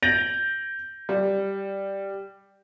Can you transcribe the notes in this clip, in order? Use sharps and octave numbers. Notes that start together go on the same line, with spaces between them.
G6 A6 A#6 D7 F7 F#7
G3